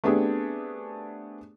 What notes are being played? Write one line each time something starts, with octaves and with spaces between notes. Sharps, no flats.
A3 B3 C4 D4 G4 G#4